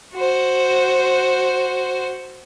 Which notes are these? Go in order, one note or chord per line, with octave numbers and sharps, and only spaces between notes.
F#4 C5